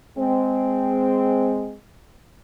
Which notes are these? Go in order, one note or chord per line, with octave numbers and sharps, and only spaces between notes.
G#3 C4